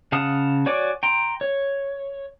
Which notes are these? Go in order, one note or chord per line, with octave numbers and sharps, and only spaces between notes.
C#3 F5 F#5 A5 D#6
F#4 C#5 D5 G#5 D6
G5 A#5 C6
C#5